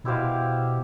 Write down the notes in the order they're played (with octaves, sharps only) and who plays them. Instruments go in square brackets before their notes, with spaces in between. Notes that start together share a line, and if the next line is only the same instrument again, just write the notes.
[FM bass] B2 [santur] E4 G4 C5 F5